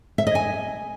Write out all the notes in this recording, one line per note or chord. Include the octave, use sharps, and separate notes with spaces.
E5
D#5
G#5